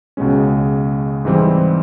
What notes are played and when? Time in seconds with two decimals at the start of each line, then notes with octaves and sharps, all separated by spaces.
0.17 C#2 B2 G#3 C#4
1.25 G#2 E3 G3 C4 E4